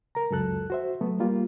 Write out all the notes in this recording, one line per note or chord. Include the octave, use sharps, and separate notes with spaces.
A#4 A#5
C#2 F#2 A4 F#6
F#4 C5 E5
F#3 A3 B3
G3 A#3 F4